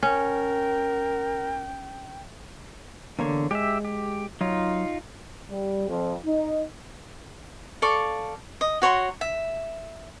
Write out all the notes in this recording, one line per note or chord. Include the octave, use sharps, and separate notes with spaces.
C#4 A#4 G5
E2 D3 A#3 C#5
G#3 G4 E5
G4
F#3 D#4 F4
G3
F2
D#4
A4 D5 F5 C#6
D#5
F#4 C#5 A#5 C6
E5